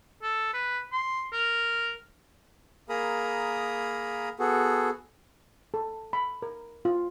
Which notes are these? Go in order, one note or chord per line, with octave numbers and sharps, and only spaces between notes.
A4
B4
C6
A#4
A#3 G#4 A#4 A#5 B5 D#6
B3 F#4 G#4 A4
A4
B5
A#4
F4